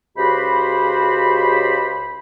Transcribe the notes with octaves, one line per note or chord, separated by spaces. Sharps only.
C#2 C#3 F#4 G4 C5 B5